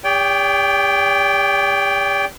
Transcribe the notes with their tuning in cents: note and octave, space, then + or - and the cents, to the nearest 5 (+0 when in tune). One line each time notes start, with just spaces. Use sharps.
G4 +45 D5 -45 G5 +0